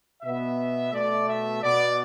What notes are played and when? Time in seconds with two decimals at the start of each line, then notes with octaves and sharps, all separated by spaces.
0.23 B2 B3 E5
0.93 B2 A3 D5
1.28 E5
1.63 B2 B3 D5